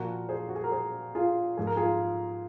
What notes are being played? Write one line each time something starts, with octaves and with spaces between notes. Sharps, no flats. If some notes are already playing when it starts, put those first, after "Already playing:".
Already playing: A#2 F3 F#4 A#4
G#4 C5
F#4
G#4
A#4
G#4 C5
F4 G#4
G#2 F3 G#4
A#4
F4 G#4